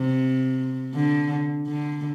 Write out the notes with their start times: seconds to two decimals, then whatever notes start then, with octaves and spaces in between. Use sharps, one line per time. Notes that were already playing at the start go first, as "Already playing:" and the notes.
Already playing: C3
0.94 D3
1.67 D3